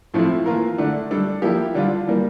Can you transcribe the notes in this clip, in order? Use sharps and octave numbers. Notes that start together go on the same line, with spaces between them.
A2 F3 A3 C4 E4
E3 A#3 F4 A#4
D3 A3 D4
G3 D4 A4
F3 A#3 E4 G4
D3 G3 D4 F4
E3 G3 A#3